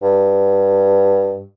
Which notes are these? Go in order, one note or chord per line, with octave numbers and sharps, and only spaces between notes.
G2